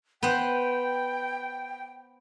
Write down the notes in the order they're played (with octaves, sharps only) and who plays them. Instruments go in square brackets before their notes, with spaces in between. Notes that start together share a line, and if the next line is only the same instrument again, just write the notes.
[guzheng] B3 C5 [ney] G5